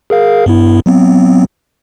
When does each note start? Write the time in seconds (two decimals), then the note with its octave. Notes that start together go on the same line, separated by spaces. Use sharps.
0.10 G#4 A#4 F5
0.46 G2 B3 E4
0.86 F#3 B3 C4